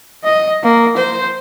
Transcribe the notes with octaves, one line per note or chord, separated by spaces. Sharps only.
D#5
A#3
C5